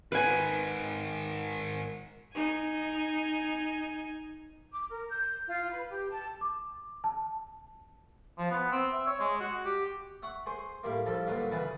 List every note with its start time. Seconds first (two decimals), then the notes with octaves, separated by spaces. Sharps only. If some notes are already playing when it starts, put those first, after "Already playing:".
0.12 G#2 D#3 B4 G#5
2.33 D#4 G#5
4.72 D6
4.90 A#4
5.10 G6
5.48 F4
5.71 B4
5.89 G4
6.10 A5
6.41 D6
7.04 A5
8.38 F3
8.51 B3
8.72 C4
8.92 E5
9.06 C#5
9.20 G#3
9.40 F#4
9.65 G4
10.22 E5 F#5 C#6
10.46 G#4 C5 C#6
10.83 A2 G3 A#3
11.06 F3 G3 A4 A5
11.27 G2 A#2 D3 F#3
11.52 C#3 E3 B4 A5